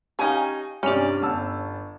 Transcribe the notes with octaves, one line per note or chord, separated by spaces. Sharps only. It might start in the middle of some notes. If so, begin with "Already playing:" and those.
C#4 D#4 G4 F5 G#5
G2 C3 C#4 D5 F7
G1 A5 E6